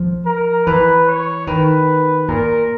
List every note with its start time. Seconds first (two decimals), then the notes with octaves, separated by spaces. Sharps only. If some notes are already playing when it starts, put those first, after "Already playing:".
Already playing: F3
0.25 A#4
0.66 E3 B4
1.06 C#5
1.47 D#3 B4
2.28 A#2 A#4